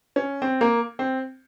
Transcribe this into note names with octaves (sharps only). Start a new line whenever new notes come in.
C#4
C4
A#3
C4